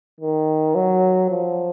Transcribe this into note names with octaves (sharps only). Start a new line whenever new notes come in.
D#3
F#3
F3